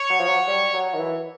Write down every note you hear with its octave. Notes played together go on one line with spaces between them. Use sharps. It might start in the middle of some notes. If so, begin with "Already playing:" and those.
Already playing: C#5
F#3
F3
F#3
G3
F#3
D#3
E3